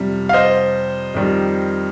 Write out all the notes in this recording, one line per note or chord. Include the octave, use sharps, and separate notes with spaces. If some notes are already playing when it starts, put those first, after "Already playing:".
Already playing: F2 C3 G3
F5
C5 D#5
F2 D#3 G3